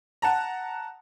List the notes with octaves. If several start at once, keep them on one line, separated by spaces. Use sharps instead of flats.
F#5 A5 A#5